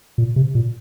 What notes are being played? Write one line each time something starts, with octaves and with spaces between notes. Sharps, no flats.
A#2
C3
A#2